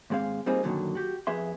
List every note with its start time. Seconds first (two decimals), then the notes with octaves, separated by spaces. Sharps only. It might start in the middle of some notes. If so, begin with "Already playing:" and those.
0.10 D#2 G#2 G#3 C4 F5
0.46 G3 A#3 C4 D#4 F4 G#4
0.63 F#2 A#2 D3 D#3 F#3
0.95 F#4 G4
1.27 F2 B3 G#4 E5 C6